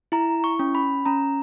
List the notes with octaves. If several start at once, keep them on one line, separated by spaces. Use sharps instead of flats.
E4 A#5
C#6
C#4
B5
C#4 A#5